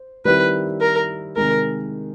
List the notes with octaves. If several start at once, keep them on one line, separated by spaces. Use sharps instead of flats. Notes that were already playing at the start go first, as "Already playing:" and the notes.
Already playing: C5
D#3 G3 C4 E4 G4 B4
A#4
C3 D#3 G#3 A#4